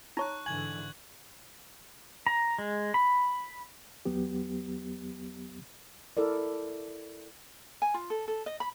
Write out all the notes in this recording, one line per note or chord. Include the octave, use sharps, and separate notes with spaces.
D#4 C#5 A#5 C#6 F#6
G#2 D3 E3 G#5 G#6 F#7
A#5
G#3
B5
E2 F#3 B3 G4
E4 A4 A#4 D5
G#5
F4
A4
A4
D#5
B5